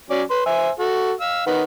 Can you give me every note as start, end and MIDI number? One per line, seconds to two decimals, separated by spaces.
0.10 0.23 54
0.10 0.23 61
0.10 0.23 74
0.30 0.42 71
0.30 0.42 84
0.46 0.70 72
0.46 0.70 76
0.46 0.70 80
0.79 1.12 66
0.79 1.12 69
1.21 1.46 77
1.21 1.46 88
1.46 1.63 51
1.46 1.63 71
1.46 1.63 78